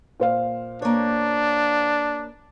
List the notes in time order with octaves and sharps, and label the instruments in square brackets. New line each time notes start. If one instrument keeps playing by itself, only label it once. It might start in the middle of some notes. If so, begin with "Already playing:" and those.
[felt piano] A#2 C5 F5
[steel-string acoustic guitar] A#3 C#5 [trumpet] D4